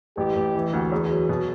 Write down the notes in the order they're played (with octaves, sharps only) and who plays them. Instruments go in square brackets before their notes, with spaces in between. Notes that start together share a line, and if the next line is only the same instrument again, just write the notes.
[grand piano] A1 [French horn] G4
[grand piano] A1
E3
D2
[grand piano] E2 [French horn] G#4
[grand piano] F#3
B2